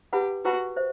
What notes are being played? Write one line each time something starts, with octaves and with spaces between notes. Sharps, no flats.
E4 G4 B4 F#5 B5
E4 F#4 B4 F#5 B5
C5 E5